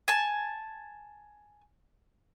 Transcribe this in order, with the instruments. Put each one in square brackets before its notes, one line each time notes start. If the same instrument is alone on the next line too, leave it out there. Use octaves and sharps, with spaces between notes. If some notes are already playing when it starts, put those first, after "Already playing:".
[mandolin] G#5 A5